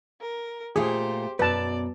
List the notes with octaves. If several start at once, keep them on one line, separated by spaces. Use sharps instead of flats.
A#4
A#2 A3 F4 G4 G#4 C5
F#2 B2 B4 D5 A5